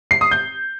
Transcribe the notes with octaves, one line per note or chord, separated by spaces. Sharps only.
C7
D#6
G6